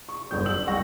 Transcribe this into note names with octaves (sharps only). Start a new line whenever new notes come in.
C#6
G1 F#2 G6
E6 F#7
C2 G#3 F#5 C#6 A#6